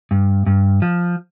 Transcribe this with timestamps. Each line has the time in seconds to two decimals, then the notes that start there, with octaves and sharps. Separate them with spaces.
0.11 G2
0.46 G2
0.82 F3